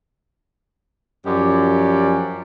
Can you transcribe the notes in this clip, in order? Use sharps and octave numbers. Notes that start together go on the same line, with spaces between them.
F#2 F3 C#4 G4 D5